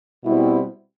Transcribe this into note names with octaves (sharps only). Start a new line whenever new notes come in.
B2 G3 C4 E4